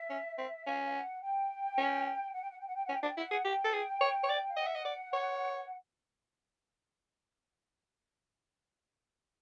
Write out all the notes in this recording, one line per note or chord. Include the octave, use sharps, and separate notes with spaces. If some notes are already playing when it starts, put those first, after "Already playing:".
Already playing: E5
C#4
C4
C#4 F5
F5
F#5
G5
C#4
F#5
G5
F#5
G5
F#5
G5
F#5
C#4
G5
D4 F#5
G5
E4 F#5
G#4
G4 G5
A4
G#4
C#5
C#5
D5
F5
D#5 F#5
E5
D#5
D5
C#5